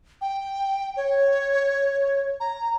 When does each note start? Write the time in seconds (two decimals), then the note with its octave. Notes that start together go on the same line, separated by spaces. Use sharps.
0.21 G5
0.97 C#5
2.40 A#5